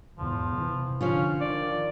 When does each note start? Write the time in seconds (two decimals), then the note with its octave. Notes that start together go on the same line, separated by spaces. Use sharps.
0.18 E2 G#2 F3
0.53 C3 E3
1.01 D3 F3 C#4 D4 F4
1.41 D#3 D5